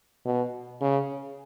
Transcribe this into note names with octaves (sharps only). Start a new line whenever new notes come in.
B2
C#3